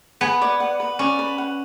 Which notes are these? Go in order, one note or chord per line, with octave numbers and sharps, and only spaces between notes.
B3 G#5
D5
F#5
B4
C#4 D5
B4
F#5